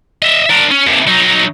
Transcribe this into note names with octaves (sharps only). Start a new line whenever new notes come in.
D#5 E5
D4 A#4
C#4
D#2 C3
F#3 D#4